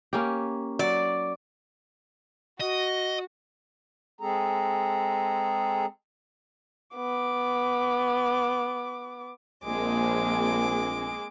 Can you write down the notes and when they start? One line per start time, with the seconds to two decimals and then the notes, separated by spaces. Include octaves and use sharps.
0.13 A#3 C#4 G4
0.79 F#3 D5
2.60 F#4 D#5
4.21 G#3 C4 G#4 A4 A#5
6.96 B3 D6
9.64 A#1 G#3 A#3 C4 G#4 D6